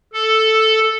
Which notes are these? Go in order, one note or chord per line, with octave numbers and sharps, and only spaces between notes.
A4